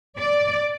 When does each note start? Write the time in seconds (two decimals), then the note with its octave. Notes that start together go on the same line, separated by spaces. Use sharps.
0.19 D5